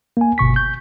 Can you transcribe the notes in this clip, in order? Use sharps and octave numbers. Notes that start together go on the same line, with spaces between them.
A#3 G#5
G1 B2 C#6 B6
G6